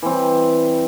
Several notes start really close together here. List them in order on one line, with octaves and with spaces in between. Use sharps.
E3 C4 G3